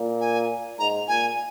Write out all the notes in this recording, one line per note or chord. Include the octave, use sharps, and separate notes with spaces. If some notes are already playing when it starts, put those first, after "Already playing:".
Already playing: A#2
G#5
G#2 A#5
A#2 G#5